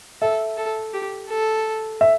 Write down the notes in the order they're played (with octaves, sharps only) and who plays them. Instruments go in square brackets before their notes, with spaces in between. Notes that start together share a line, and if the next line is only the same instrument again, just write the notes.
[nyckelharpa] A4 [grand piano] E5
[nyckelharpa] A4
G4
A4
[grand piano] E5